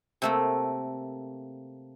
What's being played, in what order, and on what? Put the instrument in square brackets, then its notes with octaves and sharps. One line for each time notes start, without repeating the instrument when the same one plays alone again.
[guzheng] C3 A3 A#3